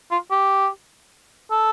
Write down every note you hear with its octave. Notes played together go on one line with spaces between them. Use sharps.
F4
G4
A4